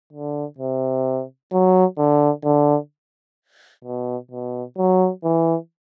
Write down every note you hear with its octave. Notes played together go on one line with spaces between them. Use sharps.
D3
C3
F#3
D3
D3
B2
B2
F#3
E3